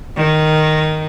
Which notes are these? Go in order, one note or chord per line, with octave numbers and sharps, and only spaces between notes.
D#3